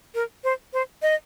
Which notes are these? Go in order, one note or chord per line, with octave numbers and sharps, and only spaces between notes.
A#4
C5
C5
D#5